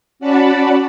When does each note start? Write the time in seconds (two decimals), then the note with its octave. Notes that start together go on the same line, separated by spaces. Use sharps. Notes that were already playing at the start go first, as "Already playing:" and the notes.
0.19 C#4 F#4 D5 F#5 A5 B5